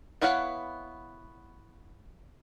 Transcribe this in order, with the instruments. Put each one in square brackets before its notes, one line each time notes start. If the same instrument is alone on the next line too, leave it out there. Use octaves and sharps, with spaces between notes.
[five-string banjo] B3 E4 C#5 F5 F#5